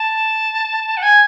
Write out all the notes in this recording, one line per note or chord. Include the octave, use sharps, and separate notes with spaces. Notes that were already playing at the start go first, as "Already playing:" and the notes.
Already playing: A5
F#5
G#5